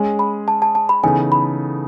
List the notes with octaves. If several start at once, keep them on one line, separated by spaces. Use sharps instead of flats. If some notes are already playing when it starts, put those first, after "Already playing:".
Already playing: G#3 C#4 G#4
B5
A5
A5
A5
B5
C#3 E3 B3 D#4 A4 G#5
B5